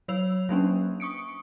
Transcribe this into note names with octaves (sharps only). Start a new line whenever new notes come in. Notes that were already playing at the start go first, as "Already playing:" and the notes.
F#3 C#5 E6 F7
F#3 A#3 C#4 D4
C#6 D#6 C#7 D7